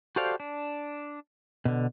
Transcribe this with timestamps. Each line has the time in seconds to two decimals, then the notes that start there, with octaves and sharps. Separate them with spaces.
0.16 F#4 G4 A4 C5 D5 F5
0.40 D4
1.65 B2 D3